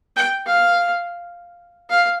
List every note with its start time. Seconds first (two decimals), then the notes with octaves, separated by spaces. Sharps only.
0.16 G5
0.46 F5
1.90 F5